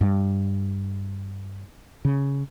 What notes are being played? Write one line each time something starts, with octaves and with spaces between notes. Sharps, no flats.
G2
C#3